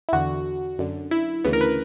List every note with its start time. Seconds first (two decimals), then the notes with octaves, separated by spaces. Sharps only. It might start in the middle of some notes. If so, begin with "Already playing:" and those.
0.09 E4
0.12 E2 D3 F#4
0.79 F#2 D3
1.11 E4
1.44 D2 C#3 E3 B3
1.53 A#4
1.61 B4